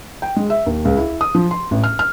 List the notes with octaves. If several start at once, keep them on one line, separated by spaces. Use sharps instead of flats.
G5
G#3
E5
D#2
C#2
E4
D#6
F3
C6
A1
F6
F6